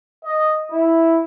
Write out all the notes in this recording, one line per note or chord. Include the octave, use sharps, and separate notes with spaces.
D#5
E4